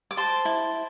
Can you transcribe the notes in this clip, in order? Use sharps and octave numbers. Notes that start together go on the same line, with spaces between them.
D6
C5 A5 C6
E4